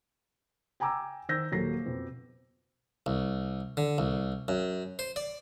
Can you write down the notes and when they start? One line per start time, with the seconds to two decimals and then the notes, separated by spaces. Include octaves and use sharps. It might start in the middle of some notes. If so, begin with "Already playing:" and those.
0.80 G5 G#5 A#5 D6 E6
1.29 D#3 C5 E6 G6 A#6
1.52 D#1 F#3 A#3 A4 A#6 C7
1.86 F2 B2
3.06 C2
3.77 D3
3.98 C2
4.48 F#2
4.99 C5
5.16 D5